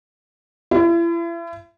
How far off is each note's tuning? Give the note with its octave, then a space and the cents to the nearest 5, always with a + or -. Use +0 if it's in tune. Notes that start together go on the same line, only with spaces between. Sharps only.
E4 +40